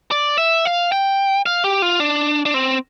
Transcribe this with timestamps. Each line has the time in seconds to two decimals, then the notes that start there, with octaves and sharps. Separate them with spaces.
0.11 D5
0.38 E5
0.65 F5
0.92 G5
1.46 F5
1.64 G4
1.82 F4
2.00 D4
2.46 D4
2.54 C4